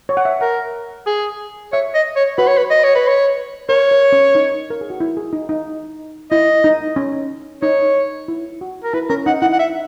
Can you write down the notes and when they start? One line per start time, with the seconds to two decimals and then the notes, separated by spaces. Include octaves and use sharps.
0.09 C#5
0.17 F#5
0.25 E5
0.41 A#4 F#5
1.07 G#4
1.73 C#5 E5
1.95 D#5
2.17 C#5
2.38 F#4 B4
2.48 C#5
2.58 B4
2.70 D#5
2.84 C#5
2.96 B4
3.08 C#5
3.69 A#4 C#5
3.91 A#4
4.12 C#4
4.35 D#4
4.70 A#4
4.81 G#4
4.90 F#4
5.00 E4
5.17 G#4
5.33 D#4
5.49 D#4
6.31 E4 D#5
6.64 D#4
6.96 C#4
7.62 D#4 C#5
8.28 E4
8.61 F#4
8.84 A#4
8.94 E4 B4
9.09 C#4 A#4
9.26 D#4 F#5
9.42 E4 F#5
9.53 F#5
9.59 E5